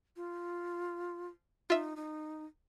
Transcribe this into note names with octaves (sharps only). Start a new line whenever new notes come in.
F4
D#4 F4 E5
D#4